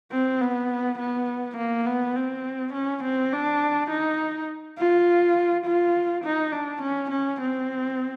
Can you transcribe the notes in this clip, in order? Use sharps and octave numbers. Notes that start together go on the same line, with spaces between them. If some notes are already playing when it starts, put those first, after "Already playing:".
C4
B3
B3
A#3
B3
C4
C#4
C4
D4
D#4
F4
F4
D#4
D4
C#4
C#4
C4